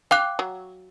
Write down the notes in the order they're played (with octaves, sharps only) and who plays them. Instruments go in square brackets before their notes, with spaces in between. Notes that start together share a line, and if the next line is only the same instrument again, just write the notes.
[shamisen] F5 [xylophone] G5 D6 F#6
[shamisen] F#3